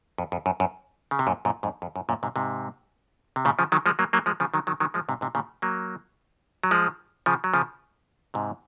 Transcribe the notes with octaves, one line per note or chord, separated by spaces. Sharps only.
F2
F2
F#2
F#2
C#3
C3
F#2 A#2
F#2 A#2
F2 G#2
F2
F#2
F#2 A#2
G#2 C3
G#2 C3
C3
A#2 C#3
C#3 F3
D#3 F#3
F3 G#3
F#3 A#3
F#3 A#3
F3 G#3
C#3 F3
D#3 F#3
D#3 F#3
D#3 F#3
F3 G#3
G#2 C3
G#2 C3
A#2 C#3
F#3 A#3
F#3
F3 G#3
C#3 F3
F#3
C#3 F3
G#2 C3